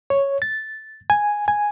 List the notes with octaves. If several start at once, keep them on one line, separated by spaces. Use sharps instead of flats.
C#5
A6
G#5
G#5